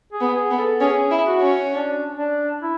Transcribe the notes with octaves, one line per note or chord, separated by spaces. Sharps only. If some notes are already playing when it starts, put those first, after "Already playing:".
G#4
B3
G#4
B3
A4
C#4 G#4
E4
F#4
C#4
D4
D4
E4